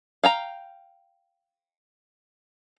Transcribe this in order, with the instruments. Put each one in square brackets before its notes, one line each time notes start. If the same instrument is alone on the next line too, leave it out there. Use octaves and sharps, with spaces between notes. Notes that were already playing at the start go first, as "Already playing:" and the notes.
[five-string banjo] F5 G5 A#5